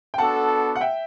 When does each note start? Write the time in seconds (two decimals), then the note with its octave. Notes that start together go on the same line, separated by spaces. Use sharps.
0.14 G5
0.18 B3 D4 F#4 A4 F#5 A5
0.76 F#5
0.81 E5 G5